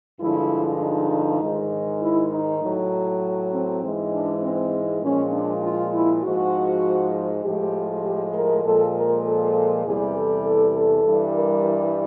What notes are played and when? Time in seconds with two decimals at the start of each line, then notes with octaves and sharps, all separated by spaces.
0.21 G2 D3 F3 G#3 E4
0.81 D#4
1.41 G#2 D#3 G#3
2.02 E4
2.32 D#4
2.62 A2 F#3
3.53 C4
3.82 G#2 E3 G#3
4.12 D4
4.42 C4
5.02 A#2 F3 G#3 C#4
5.33 D4
5.63 F4
5.93 E4
6.23 G#2 F3 G#3 F#4
7.45 A2 F3 G#3 G4
8.05 G4
8.34 A#4
8.65 A#2 F3 G#3 A4
8.94 A#4
9.25 A4
9.85 E2 C3 E3 G3 G#4
10.15 A4
10.46 A4
10.75 A4
11.05 G2 E3 G3
11.36 A#4